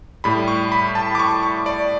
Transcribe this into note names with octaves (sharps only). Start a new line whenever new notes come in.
A2 G3 B5
C#6
B5
A5
D6
C#6
C#6
D5